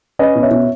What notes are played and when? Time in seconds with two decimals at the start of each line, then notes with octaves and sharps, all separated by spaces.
0.19 C#4 B4 D#5
0.35 B2
0.43 C#5 E5
0.51 B2